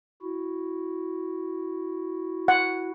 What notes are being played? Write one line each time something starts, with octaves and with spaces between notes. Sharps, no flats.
E4 F#4
F#5